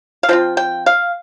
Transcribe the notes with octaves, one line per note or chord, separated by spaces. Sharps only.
F5
F3 C4 F4 G5
G5
F5